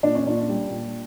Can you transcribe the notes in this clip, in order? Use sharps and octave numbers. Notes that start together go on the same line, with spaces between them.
A#2 D4
C#4
A#2 D4
G3
A#2